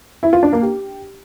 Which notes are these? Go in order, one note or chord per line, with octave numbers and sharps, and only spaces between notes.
E4
F4
D4
A#3
G4